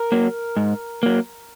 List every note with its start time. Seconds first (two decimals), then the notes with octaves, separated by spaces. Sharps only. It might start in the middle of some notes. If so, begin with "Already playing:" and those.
Already playing: A#4
0.12 F#3 A#3
0.57 G#2
1.03 F#3 A#3